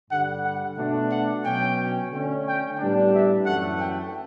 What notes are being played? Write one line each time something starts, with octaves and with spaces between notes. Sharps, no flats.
G2 D3 G3 F#5
F#5
B2 A3 D4
F#5
B2 F#3 C#4 G5
D3 A3 C#4
G5
A2 G3 B3 D4
E5
F#2 E3 A3 F#5
G5